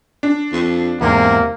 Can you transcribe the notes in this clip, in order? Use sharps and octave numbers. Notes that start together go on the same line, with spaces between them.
D4
F2
E2 G#2 C3 A#3